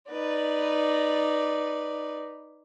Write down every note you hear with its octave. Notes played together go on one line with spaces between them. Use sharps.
D#4 B4 D5